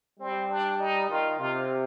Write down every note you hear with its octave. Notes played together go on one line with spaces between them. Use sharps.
G3 C4
D4
D#4
D#3 F4
C3 F4